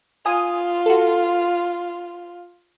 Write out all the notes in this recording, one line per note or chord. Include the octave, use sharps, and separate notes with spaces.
F4 G#5 D#6
F#4 A4